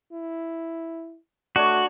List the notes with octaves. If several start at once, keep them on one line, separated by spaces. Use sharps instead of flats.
E4
A3 D4 F#4 C#5